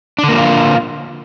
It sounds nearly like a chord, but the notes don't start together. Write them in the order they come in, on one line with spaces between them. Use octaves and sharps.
D4 D3 A#3 F3 F4